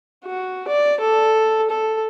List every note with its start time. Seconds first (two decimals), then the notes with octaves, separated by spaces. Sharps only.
0.25 F#4
0.68 D5
1.00 A4
1.70 A4